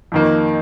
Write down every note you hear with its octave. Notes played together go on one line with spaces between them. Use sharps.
F2 D#3 A#3